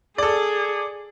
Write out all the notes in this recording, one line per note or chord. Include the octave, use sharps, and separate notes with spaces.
G#4 A4 D5